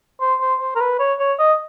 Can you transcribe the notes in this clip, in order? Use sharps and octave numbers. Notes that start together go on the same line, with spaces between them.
C5
C5
C5
A#4
B4
C#5
C#5
D#5